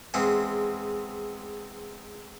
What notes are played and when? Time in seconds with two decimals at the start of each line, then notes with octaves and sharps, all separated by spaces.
0.14 E2 G#3 C4 F#5